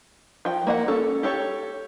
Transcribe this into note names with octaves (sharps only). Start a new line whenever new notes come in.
F3 G5
A#3 C#5 F#5
C#4 A4
G4 A4 C#5